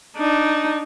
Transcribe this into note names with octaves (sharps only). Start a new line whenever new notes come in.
D4 D#4